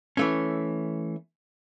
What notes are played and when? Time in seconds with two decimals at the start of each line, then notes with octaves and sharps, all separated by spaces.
0.17 E3 A3 C#4